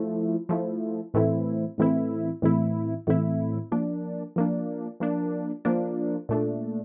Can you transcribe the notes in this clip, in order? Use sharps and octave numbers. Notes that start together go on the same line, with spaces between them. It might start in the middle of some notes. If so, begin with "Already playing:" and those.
Already playing: F3 A3 E4
F3 A3 E4
A2 E3 A3 C4 E4
A2 E3 A3 C4 E4
A2 E3 A3 C4 E4
A2 E3 A3 C4 E4
F3 A#3 D4
F3 A#3 D4
F3 A#3 D4
F3 A#3 D4
A#2 A3 D4